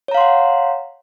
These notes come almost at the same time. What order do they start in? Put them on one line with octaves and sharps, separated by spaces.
C#5 A#5 F5 C6 F#5